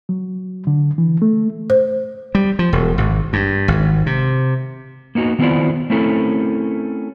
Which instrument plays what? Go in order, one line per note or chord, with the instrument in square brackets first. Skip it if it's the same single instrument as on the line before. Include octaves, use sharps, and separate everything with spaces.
[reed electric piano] F#3
D3
E3
A3
[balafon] C5
[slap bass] G3
F3
E1
G#1
G2
G#1
C3
[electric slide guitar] A#3 B3 D#4 F#4
D#3 B3 C4 E4 F4 D5
A3 C4 C#4 E4 A4 A#4